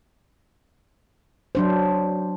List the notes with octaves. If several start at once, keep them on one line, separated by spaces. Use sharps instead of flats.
F#3 D4 C5